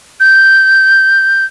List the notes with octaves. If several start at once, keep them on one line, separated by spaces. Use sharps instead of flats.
G6